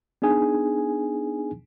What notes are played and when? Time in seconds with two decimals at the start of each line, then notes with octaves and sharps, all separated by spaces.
0.22 B3 D4 D#4 G#4 G#5